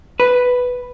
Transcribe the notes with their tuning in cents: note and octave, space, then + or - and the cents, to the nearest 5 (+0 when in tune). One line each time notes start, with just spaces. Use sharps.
B4 +5